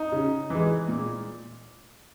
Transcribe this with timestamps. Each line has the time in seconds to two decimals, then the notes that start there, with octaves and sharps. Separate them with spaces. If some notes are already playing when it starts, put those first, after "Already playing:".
Already playing: D#4
0.12 C#3
0.50 E3 G#3
0.88 A#2